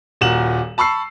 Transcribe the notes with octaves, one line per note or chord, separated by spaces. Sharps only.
D#1 A#2 F#4 E7 F#7
A5 B5 C#6 E6 C7